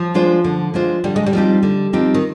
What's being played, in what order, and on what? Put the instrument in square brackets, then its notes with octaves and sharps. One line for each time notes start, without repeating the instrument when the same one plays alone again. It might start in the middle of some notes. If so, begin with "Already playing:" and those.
Already playing: [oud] F3
[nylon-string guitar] G#3 D4 F4 C5
D3
G#3 D4 F4 C5
[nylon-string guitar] D3 [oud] G3
[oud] G#3
G3
[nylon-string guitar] F3 C4 D#4 G4
D3
F3 C4 D#4 G4
[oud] D#3